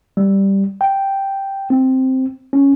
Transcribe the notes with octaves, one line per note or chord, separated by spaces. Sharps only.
G3
G5
C4
C#4